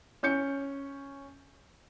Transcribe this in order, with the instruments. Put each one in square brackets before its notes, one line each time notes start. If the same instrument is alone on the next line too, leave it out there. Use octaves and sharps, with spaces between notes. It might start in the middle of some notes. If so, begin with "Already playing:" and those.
[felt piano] C#4 G6 C#7